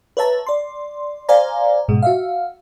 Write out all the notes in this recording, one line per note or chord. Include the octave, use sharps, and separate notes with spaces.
B4 C#5 E5 A5 A#5
D5 C6
C5 D5 F5 G#5 A#5
G#2 B2 G#3
F#4 E5 F5